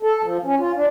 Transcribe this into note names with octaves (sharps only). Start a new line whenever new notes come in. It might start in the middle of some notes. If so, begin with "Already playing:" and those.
A4
F3
C#4
F4
D4